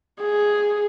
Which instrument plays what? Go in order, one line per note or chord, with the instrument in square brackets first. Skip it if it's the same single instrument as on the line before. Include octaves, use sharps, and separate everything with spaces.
[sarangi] G#4